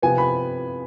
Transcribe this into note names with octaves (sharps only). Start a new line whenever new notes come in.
C3 F3 B3 G#5
B5